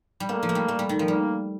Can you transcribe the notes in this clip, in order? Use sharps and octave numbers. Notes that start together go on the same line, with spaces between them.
G3
A3 A#3
F3
A3
G3
A3
G3
D#3
F3
G3 A#3